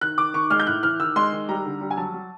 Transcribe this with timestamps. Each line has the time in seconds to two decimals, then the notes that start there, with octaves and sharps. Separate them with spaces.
0.01 D#3 F#6
0.18 D#3 D6
0.34 D#3 C#6
0.50 G#3 F6
0.60 G6
0.67 A2 F#6
0.83 E3 F6
1.00 D#3 E6
1.16 G#3 C6
1.32 D#3
1.49 G3 A#5
1.65 D3
1.81 G3
1.91 G#5
1.98 F#3 A5
2.14 F#3